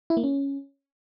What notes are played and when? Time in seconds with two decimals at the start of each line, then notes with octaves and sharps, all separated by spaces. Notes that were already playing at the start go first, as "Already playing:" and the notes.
0.10 E4
0.17 A#3
0.24 C#4